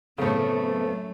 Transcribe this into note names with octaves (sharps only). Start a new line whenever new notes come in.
F#2 A2 C#3 F#3 A3 B3 C4 A4